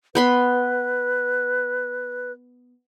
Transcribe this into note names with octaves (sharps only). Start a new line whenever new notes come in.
B3 B4 B5 C6